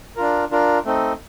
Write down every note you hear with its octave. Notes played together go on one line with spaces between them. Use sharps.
D4 F4 A#4
D4 F4 A#4
A3 C4 D#4